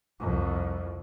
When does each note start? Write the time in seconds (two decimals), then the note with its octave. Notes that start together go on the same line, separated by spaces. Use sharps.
0.20 C2 F2